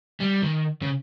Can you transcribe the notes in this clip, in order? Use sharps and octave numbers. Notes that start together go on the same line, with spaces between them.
G3
D#3
C#3